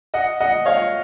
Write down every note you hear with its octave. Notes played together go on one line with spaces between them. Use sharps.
D#5 F#5
D#5 F#5
C#5 F5